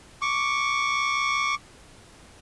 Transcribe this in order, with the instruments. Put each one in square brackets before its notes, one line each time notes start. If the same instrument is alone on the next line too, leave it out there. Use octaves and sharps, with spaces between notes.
[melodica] C#6 D6